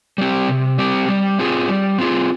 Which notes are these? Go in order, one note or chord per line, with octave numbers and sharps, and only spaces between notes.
G3 C4 G4
C3
G3 C4 G4
G3
C4 F4 G#4
G3
C4 F4 G#4